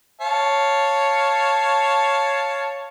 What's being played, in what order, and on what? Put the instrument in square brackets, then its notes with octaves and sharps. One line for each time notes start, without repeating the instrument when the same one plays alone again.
[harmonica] C#5 F5 A5